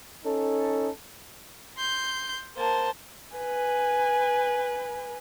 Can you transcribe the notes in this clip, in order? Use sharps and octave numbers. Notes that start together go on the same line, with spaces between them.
C#4 D#4 A4
C6 G6
A#3 C5 A5
B4 G#5